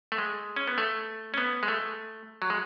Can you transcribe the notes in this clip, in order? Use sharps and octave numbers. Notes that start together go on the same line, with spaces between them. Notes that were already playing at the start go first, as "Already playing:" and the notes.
A3
G#3
C#4
B3
A3
C#4
B3
G#3
A3
F#3
G#3